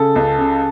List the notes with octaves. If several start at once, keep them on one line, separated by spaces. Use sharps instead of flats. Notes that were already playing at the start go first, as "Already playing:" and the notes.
Already playing: C#3 A4
C#2
C#3